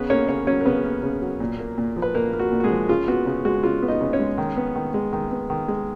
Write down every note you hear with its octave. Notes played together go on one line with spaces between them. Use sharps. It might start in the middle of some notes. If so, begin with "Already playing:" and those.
Already playing: C#3 B3 B4
A#3 C#4 C#5
C#3 C#4 C#5
F#3 C#4 C#5
A#4
C#3 B3 B4
A#3
C#3
F#3
A#2
A#3
A#2
F3
B4
A#2 A#3 A#4
A#3
F#4
A#2
F#4
G#3 G#4
F3
C#3 F4
B3 F#4
C#3
G#3 F#4
C#3 F4
B3
D#4 D#5
C#3
C#4 C#5
G#3
D#3
B3
D#3
G#3
D#3
B3
D#3
G#3